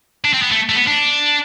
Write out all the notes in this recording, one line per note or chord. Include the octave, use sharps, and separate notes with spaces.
D4
C4
B3
A3
A3
B3
D4